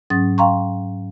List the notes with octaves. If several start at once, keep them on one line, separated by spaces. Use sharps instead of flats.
G#2 F#3 C#4 D#6 A6
F5 G5 A#5 C6 C#6